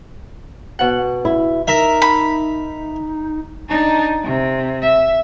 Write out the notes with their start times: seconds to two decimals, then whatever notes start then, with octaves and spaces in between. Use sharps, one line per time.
0.79 B2 F#5
1.25 E4
1.68 D#4 A#4 E5
2.02 B5
3.69 D4 D#4
4.23 C3
4.82 E5